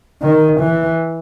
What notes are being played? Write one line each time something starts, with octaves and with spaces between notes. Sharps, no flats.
D#3
E3